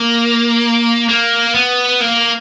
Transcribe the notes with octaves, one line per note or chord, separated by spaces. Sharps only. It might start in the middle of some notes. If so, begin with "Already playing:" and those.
Already playing: A#3
A#3
B3
A#3